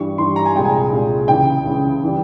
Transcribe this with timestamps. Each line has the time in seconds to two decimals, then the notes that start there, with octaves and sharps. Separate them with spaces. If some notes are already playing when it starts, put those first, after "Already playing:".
Already playing: G2 E3 G3 C#6
0.18 G2 E3 G3 C6
0.36 A#5
0.45 G#5
0.55 C2 A#2 G#3 G5
0.64 G#5
0.92 C2 A#2 G#3
1.28 C#2 C#3 E3 G5
1.65 C#2 C#3 E3
2.04 E3 G3